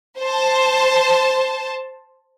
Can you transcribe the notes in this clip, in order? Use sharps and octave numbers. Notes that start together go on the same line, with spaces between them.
C5 A5